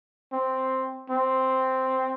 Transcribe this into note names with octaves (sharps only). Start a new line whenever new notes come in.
C4
C4